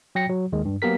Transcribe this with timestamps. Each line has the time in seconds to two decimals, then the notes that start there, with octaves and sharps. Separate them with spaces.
0.15 F#3 G5 A#6 C#7
0.29 F#3
0.52 D#2 D#3 G#3
0.65 G2
0.82 F#3 A#3 B3 G4 A#4 B6